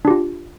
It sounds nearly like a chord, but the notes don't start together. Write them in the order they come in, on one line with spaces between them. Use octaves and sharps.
D4 G4 F4